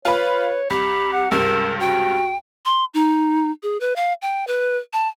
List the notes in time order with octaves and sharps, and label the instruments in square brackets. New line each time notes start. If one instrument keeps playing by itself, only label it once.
[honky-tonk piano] F4 B5 [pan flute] B4 [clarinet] C#5
[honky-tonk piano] C2 [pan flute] G4 [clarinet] B5
[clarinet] F#5
[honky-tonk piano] C#2 G2 C3 [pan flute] A#4 [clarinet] E6
[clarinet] F#4 [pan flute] G5
[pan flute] C6
D#4
G#4
B4
F5
G5
B4
A5